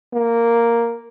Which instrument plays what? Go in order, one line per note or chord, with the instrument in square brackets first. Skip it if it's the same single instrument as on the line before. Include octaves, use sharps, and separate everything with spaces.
[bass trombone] A#3